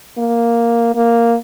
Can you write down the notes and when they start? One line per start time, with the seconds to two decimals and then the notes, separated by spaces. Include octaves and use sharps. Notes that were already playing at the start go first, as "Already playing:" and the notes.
0.18 A#3
0.95 A#3